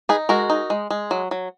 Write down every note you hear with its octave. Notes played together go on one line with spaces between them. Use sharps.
D#4 G#4 B4
G#3 F#4 A#4
D#4
G#3
G#3
F#3
F#3